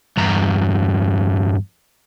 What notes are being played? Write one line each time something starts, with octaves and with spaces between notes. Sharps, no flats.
E2 G2 A#5